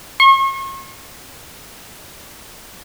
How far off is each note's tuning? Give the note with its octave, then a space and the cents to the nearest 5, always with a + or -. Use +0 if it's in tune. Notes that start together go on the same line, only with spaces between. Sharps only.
C#6 -40